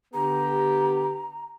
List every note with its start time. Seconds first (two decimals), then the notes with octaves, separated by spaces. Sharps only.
0.14 D3 B3 G4 A#5